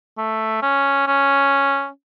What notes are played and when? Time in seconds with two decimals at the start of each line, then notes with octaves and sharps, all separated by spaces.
0.17 A3
0.62 C#4
1.07 C#4